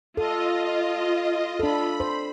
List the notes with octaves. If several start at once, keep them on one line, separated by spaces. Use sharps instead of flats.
F4 A4 D#5
D4 A4 B5
C5